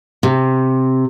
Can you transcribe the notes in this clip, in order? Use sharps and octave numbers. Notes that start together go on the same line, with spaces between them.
C3